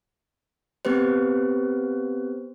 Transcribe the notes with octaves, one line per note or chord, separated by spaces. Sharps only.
B3 C4 G4 B4 C5